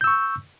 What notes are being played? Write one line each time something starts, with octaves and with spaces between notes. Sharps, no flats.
C#6 E6 G6